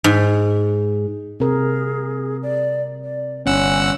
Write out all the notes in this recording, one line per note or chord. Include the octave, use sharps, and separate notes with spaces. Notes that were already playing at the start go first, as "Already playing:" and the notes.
G#2
C3 G#4 A#4
D5
D5
G1 C#4 F#5 G#5 E6